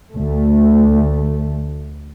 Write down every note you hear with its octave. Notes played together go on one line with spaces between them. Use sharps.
D2 A3